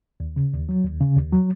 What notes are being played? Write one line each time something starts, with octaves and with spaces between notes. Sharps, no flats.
D#2
C#3
D#2
F#3
D#2
C#3
D#2
F#3